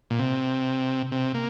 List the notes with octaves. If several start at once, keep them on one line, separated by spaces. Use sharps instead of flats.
A#2
C3
C3
A#3